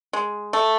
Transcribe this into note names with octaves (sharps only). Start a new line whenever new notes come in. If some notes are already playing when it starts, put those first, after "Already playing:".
G#3
A3